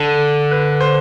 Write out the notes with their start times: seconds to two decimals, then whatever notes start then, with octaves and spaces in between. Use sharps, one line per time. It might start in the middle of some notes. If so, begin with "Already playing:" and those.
Already playing: D3 A4
0.51 B4
0.81 C5